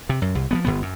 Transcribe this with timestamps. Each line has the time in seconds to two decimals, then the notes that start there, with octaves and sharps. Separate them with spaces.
0.09 C3
0.22 F#2
0.35 C2
0.51 F3 G#3 B3
0.65 G1 E2 B3
0.82 F#2